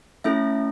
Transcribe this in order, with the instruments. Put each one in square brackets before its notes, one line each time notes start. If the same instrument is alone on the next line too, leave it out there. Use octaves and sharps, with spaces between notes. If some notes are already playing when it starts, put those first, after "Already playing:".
[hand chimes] A3 C#4 E4 A4 E5